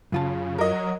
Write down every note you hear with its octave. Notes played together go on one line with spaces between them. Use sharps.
F#2 C#3 F4 A5
F#3 A#4 D#5